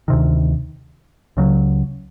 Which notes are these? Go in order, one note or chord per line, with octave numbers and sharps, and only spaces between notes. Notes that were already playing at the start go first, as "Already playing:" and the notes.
D2 C3 D#3
C#2 C#3 F#3